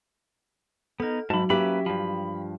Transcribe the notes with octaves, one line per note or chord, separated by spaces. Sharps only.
B3 D#4 A4 F6
G#2 F#3 F#4 A5 B5
A#3 C#4 G4 B4 E5 B5
G2 F3 B5